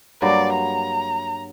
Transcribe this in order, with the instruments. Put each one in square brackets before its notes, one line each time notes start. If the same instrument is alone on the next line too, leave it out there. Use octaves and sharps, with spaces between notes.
[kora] G2 F#3 A#3 [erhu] D5
[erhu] A#5